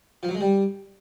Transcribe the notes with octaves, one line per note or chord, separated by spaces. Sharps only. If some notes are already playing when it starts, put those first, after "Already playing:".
F3
F#3
G#3
G3